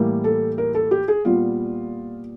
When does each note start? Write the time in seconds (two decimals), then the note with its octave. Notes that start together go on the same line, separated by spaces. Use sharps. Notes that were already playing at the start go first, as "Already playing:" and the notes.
Already playing: A2 E3 G3 A#3
0.24 A4
0.58 A#4
0.74 A4
0.91 G4
1.08 G#4
1.25 A#2 G3 B3 F4